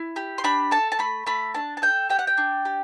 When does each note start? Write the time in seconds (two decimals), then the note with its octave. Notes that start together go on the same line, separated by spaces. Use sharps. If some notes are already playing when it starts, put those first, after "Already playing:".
Already playing: E4
0.16 G4
0.38 C6
0.44 D4 B5
0.71 A4 A5
0.92 A5
0.99 A3 B5
1.26 A3 B5
1.55 D4 A5
1.77 A5
1.82 A4 G5
2.10 G4 G5
2.19 F#5
2.27 G5
2.38 D4
2.65 G4